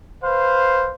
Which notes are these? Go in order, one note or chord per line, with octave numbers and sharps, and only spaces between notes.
B4 C5 F5